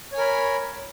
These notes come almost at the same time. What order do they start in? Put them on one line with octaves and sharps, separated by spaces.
C#5 G#5 A#4 B5